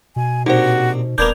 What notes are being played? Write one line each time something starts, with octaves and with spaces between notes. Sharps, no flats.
B2 G#5
A#1 C3 D#4 F#4 C5
D#1 A#3 B3 D4 A#4 G6 G#6 F7